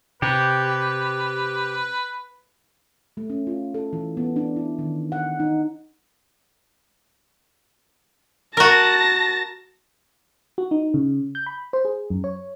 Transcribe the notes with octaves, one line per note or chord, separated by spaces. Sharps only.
C3 G4 B4
A3
C#4
F4
A4
E3
B3
D4
E4
D#3
F#5
D#4
F#4 A#4 A5 A#6
F#4
D#4
C#3
G6
B5
C5
G#4
F#2
C#5